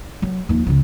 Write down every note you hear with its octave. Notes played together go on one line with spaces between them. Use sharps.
F#3
D#2 F3
C#2 C#3